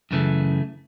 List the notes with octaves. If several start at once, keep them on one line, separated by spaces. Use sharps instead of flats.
F#2 C#3 E3 A3